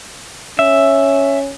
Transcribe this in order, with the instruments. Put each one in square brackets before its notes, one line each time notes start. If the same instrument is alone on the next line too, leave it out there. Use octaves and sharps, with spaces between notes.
[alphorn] C#4 [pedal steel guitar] E5